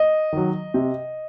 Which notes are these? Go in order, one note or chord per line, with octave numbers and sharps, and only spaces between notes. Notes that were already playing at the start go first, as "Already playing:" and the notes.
Already playing: D#5
D#3 F#3
C3